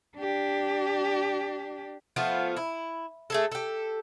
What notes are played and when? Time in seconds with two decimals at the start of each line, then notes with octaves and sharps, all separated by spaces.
0.17 D4 G4
2.16 F3 A3 B3 F4
2.57 E4
3.30 A3 G#4 A4
3.52 G4 A4